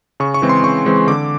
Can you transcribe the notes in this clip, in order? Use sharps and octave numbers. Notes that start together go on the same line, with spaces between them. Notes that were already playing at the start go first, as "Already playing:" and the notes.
C#3 C#6
C#6
E3 G#3 C4
C6
C#3 C#6
E3 G#3 C4
D3 D6